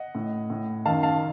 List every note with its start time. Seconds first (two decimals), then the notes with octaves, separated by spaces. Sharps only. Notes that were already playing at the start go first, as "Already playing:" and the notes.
Already playing: D#5 F#5
0.15 A2
0.50 A2
0.85 F#2 D#3 F5 A5
1.03 F5 A5